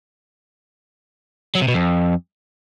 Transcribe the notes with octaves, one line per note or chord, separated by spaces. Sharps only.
F#3
C3
B2
F2